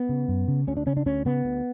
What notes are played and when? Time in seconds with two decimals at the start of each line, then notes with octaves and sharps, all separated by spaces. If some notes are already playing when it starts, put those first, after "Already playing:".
Already playing: B3
0.09 C#3
0.28 F#2
0.48 C#3
0.67 D2 C#4
0.77 D4
0.86 C#3 C#4
0.97 D4
1.06 D2 C#4
1.25 C#3 B3
1.45 D2